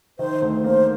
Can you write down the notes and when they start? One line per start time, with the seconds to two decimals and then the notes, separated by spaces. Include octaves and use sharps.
0.19 D#3 C5
0.42 D2
0.64 A#3 C5